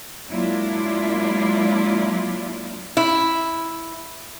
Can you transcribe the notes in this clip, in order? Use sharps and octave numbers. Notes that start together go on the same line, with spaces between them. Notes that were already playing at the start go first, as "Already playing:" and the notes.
F#3 G#3 A#3 D4 E4 F4
E4